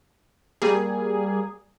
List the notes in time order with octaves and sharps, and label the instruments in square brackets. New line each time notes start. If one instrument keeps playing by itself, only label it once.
[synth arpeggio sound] G3 A#3 G#4